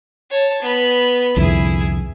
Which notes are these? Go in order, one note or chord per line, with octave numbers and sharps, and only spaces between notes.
C#5 A5
B3 B5
C2 F2 D3 E4 G#4